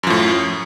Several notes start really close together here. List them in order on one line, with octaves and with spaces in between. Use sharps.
F#2 F3 A2